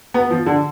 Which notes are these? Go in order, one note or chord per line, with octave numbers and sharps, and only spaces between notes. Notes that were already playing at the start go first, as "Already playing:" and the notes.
B3
F3
D3